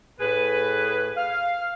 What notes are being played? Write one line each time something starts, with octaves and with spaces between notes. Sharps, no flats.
A2 G#4 B4
F5